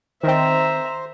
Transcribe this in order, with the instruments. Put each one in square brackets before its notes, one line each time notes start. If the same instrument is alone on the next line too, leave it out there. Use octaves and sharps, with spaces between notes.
[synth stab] D#3 C4 [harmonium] C5 [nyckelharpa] E5 A#5